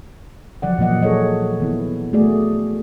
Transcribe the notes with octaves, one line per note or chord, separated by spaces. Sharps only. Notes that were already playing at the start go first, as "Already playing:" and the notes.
F3 F#3 D5 F#5
A#2 E3 A#3 D#5 F#5
G#4 A4 C#5 D#5
D#3 B3 E4
A3 F#4 G#4 D5